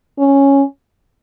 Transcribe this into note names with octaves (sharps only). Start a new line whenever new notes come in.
C#4